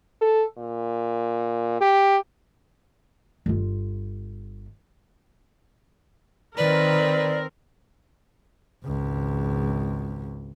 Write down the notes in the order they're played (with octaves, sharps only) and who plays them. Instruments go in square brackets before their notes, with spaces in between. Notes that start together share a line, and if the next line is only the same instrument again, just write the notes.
[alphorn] A4
A#2
G4
[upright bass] G1 F4
[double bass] D#3 [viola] C4 A#4 [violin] B4 [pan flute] D5
[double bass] G#1 C#2